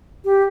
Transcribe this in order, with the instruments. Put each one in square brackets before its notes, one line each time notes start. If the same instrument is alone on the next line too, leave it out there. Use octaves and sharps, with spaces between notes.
[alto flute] G4